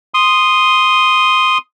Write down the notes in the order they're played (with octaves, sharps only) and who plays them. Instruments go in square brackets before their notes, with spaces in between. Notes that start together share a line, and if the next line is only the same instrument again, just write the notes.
[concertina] C6 D#6